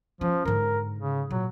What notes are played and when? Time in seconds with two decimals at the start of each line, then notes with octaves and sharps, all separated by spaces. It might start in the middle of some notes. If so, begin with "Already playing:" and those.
0.21 F3 C#4
0.45 G#2 D3 A#4
0.99 C#3
1.31 A#2 F#3